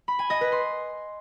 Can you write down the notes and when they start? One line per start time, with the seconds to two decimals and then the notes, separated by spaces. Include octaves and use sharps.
0.08 B5
0.19 G#5
0.30 D#5
0.41 B4
0.52 C6